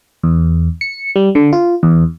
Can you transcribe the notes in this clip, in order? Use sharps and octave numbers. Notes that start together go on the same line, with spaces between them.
E2
C#7
G3
D3
F4
E2